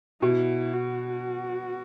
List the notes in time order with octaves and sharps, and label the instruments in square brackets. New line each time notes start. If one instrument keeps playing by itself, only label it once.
[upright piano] B2 [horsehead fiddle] E4
[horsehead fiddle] F#4